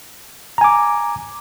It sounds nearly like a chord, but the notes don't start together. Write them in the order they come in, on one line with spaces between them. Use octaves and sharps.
A#5 G#5 D6